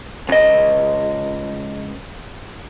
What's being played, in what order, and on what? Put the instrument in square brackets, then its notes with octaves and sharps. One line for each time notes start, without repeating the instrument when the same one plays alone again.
[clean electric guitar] C#2 D#5